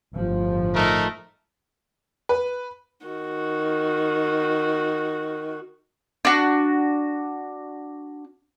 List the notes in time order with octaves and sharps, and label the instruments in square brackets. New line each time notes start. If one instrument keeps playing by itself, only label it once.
[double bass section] G1 A2 F3
[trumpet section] A3 D#4 A#4
[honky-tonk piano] B4
[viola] D#3 F#4
[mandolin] D4 F#4